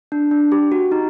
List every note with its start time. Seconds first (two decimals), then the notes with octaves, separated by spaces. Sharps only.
0.12 D4
0.31 D4
0.52 G4
0.72 F#4
0.92 D#4